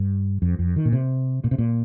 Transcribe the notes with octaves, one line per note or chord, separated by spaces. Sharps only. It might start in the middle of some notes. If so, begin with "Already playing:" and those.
Already playing: G2
F2
F2
D#3
A#2
C3
A#2
C3
A#2